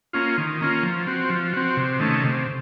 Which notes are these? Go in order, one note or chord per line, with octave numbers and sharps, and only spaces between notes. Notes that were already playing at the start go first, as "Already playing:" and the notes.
A#3 C#4 F4
D#3
A#3 C#4 F4
F3
C4 F#4
F3
C4 F#4
C3
D#3 A3 C#4
C3